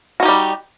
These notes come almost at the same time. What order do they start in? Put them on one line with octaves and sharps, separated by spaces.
F#4 D#4 G4 G3